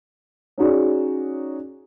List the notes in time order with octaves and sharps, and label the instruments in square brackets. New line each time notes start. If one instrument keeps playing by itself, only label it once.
[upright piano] C#4 D#4 F#4 G#4 D5